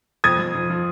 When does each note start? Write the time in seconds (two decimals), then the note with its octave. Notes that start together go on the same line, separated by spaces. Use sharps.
0.24 F2 D#6 G#6
0.39 F2
0.55 F3
0.70 F3